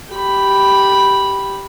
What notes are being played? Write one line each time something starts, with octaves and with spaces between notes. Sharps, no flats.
G4 B5